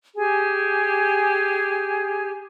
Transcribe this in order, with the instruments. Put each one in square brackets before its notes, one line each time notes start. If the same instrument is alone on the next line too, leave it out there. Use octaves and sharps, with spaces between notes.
[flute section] G4 G#4 G#5